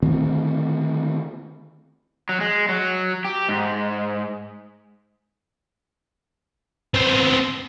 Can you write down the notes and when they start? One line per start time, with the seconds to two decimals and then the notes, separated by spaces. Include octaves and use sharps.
0.02 D3 D#3 A3 C4
2.29 F#3
2.41 G#3
2.69 F#3
3.25 G4
3.49 G#2
6.94 B3 C4